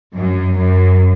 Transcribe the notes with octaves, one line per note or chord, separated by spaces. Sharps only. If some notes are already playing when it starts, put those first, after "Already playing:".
F#2
F#2